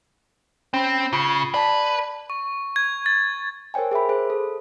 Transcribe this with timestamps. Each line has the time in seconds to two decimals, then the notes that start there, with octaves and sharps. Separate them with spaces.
0.74 C4 C#4 B5
1.13 C#3 F4 B5 C7
1.54 B4 D5 A5 B6
2.30 C#6
2.76 G#6
3.06 A6
3.74 A#4 C5 C#5 G5 G#5
3.91 G#4 A#4 E5 B5
4.09 G#4 C5
4.30 A4